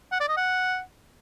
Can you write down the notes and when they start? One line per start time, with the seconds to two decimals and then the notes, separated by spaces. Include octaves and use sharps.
0.12 F#5
0.20 D5
0.29 D#5
0.37 F#5